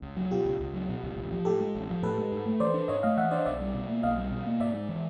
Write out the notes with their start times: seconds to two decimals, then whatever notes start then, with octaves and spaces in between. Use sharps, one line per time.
0.02 C#2
0.16 F#3
0.31 B2 F4 G4
0.45 C#2
0.60 C#2
0.74 F#3
0.89 B2
1.03 C#2
1.16 A1
1.31 F3
1.45 A2 G4 A4
1.60 G#3
1.75 A1
1.89 F3
2.03 A2 A4 B4
2.18 G#3
2.32 G#2
2.46 A3
2.60 E3 C5 D5
2.74 D4
2.88 G#2 C#5 D#5
3.03 A3 D#5 F5
3.17 E3 E5 F#5
3.31 D4 C5 D5
3.39 D#5
3.46 B1 D5 E5
3.61 G3
3.74 B2
3.89 A#3
4.03 B1 D#5 F5
4.18 G3
4.31 B2
4.46 A#3
4.60 G#2 D5 E5
4.74 G#3
4.89 E3